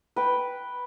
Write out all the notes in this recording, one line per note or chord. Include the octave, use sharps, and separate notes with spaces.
B4 G5